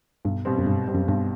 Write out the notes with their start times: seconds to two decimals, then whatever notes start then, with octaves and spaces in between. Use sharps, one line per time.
0.25 B1 G2
0.45 B2 G3 C4
0.58 F#2
0.66 B1 G2
0.87 B2 G3 C4
0.95 F#2
1.08 B1 G2